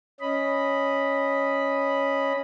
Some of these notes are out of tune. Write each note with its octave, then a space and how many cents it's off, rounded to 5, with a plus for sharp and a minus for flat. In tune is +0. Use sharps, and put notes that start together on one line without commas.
C#4 +0 D#5 +0 B5 +0